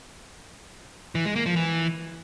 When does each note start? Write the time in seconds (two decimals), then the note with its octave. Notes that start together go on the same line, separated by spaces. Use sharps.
1.15 E3
1.25 G#3
1.36 A#3
1.46 F3
1.56 E3